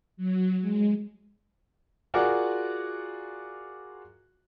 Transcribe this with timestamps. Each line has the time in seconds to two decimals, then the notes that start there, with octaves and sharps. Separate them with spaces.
0.17 F#3
0.61 G#3
2.14 F4 F#4 G#4 A#4 D5 F#5